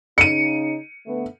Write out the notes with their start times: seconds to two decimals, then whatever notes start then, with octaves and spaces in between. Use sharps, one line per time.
0.18 C#3 D#4 C#7 D#7
1.06 D3 A3 B3